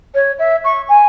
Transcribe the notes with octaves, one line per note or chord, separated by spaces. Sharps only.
C#5
E5
C#6
G#5